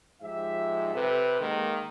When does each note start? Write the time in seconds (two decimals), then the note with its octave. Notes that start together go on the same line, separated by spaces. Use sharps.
0.22 G#2 F3 G4 E5
0.94 C3 A4 B4
1.40 D#3 G#3 A#3